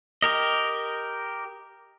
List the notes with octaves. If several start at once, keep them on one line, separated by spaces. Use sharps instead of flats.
G4 A#4 D#5